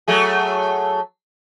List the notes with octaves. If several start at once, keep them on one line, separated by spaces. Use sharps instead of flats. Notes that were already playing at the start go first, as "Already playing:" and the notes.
F#3 A3 G#4